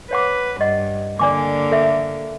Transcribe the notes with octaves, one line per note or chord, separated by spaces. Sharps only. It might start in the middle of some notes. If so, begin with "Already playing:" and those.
B4 C#5 F#5 D6
G2 D#5 F#5
D3 A#3 D5 G#5 D6
A4 E5